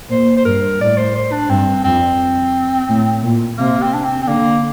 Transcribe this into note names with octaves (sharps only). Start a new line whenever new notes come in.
A#2 C5
C5
G2 A#4
A2 D5
C5
C5
D4
G2 C4
F2 C4
A2
A#2
C3 A#3
C4
D4
C4
C4
D3 A#3